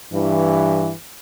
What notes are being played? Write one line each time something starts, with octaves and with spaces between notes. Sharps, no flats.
G2 E3